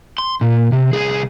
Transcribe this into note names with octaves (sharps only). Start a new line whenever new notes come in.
C6
A#2
C3
C2 G#4